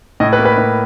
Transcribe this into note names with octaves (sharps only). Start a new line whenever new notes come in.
A2 D#5
B4
A#3
B4
A2